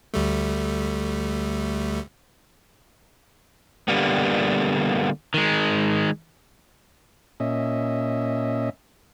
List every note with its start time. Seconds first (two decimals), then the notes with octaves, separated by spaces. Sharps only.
0.14 D2 G3 A3
3.88 D3 G3 A#3 B3
5.34 D#3 G#3
7.40 A#2 C#4 D#5 E5